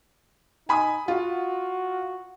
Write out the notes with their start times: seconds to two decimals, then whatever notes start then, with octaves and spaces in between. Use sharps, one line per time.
0.69 D#4 G#5 B5 D#6
1.08 F4 F#4